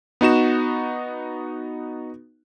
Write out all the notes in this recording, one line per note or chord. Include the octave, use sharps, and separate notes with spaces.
B3 D#4 F#4 E7